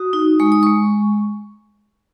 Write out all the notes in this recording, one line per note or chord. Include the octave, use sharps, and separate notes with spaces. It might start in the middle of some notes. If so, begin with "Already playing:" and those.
Already playing: F#4 D#6
D#4
G#3 C#6
D#6
G#3 C#6